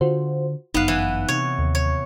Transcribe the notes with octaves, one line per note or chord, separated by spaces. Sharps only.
D3 F4 F#4 C5
G1 F#2 B3 D#4 F5 F#5 F#6
E3
C3 C#5
D#2
C#5